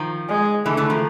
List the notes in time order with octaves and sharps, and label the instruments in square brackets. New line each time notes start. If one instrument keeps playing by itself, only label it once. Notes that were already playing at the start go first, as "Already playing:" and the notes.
Already playing: [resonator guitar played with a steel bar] D#3 F3
[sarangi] G#3
[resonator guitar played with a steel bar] D3 E3 [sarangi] A3
[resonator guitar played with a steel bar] D3 E3
D#3 F3